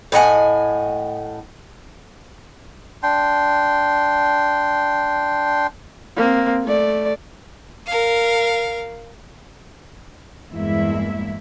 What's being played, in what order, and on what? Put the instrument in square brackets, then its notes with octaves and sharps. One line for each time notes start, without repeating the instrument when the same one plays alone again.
[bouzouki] A2 D#5 F#5 G#5
[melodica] D4 G5 C6
[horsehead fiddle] A#3 C4
A3 D5
[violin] A#4 F5
[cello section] E2 G2 G#3 A#3 E4 E5